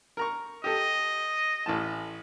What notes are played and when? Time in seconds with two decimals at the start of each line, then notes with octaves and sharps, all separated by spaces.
0.17 A#4 A#5 C#6
0.64 G4 A4 D#5
1.66 A1 E3 A5